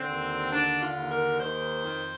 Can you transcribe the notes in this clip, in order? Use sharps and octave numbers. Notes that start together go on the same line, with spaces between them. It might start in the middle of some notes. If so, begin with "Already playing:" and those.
Already playing: D3 C4
D#2
D3 D4
F4
D#2
A#4
D#3 C5
F2